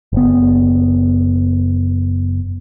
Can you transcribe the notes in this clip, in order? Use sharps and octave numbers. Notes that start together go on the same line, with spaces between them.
F#1 B3